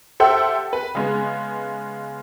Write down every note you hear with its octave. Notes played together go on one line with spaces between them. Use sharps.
G4 A4 C5 E5 F#5 G5
B4
C#3 G#3 B3